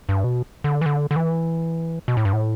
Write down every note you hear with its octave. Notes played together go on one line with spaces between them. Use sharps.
G2
B2
D3
E3
D3
D3
E3
B2
A2
G2
A2